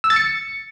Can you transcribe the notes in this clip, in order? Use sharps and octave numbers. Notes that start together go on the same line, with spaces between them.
E6
A6
C#7